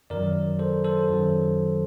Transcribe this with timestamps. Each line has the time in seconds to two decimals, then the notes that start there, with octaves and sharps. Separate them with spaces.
0.10 F#2 D#3 F#3 A#4 D5
0.59 A4 C5
0.84 A4 C5
1.09 F#2 D#3 F#3